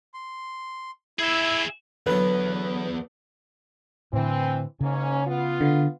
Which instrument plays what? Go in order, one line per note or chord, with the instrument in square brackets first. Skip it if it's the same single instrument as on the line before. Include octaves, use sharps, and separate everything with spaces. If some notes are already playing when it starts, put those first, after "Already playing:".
[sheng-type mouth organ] C6
[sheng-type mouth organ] E4 [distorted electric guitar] G#4 E5
[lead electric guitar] E2 B3 [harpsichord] D3 F#3 [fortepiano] B4
[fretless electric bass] A2 D3 [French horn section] E3 C4
[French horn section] G#2 A#3 C#4 [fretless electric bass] C#3
[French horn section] B3 F4
[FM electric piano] D3